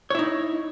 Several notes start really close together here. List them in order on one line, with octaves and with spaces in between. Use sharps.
C#5 E4 D#4